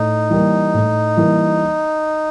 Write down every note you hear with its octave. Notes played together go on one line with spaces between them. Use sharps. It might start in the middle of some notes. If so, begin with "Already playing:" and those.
Already playing: A2 D#4
E3 G3 A#3
A2
E3 G3 A#3